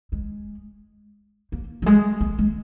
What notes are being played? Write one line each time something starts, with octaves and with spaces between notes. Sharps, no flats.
G#3
A#3
F#3
G#3
A#3
G#3